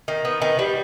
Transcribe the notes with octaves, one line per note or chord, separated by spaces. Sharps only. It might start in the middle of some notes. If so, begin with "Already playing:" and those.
D#3
B3
D#3
G3